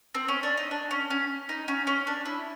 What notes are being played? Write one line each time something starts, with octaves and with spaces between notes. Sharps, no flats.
C4
C#4
D4
D#4
D4
C#4
C#4
D#4
C#4
C#4
D4
E4